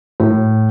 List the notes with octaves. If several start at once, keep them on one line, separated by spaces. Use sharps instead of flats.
A2